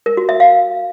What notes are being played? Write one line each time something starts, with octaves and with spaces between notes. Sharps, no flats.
A#4
F#4
E5
F5